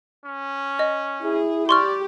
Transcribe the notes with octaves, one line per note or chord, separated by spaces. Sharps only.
C#4
D#5
E4 G#4
G4 D5 C6 C#6 F6